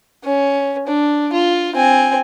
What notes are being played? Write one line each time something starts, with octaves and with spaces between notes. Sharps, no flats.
C#4
D4
F4
C4 G#5